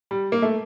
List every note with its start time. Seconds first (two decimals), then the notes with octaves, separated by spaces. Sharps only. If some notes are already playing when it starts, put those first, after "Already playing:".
0.11 G3
0.32 A#3
0.42 A3